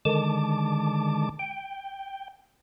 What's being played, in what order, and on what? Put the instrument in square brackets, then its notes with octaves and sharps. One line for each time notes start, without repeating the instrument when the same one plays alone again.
[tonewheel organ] D3 D#3 G#3 A5 D6
G5